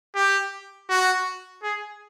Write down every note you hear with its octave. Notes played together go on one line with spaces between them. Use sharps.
G4
F#4
G#4